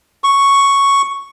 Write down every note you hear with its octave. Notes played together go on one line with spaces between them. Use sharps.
C#6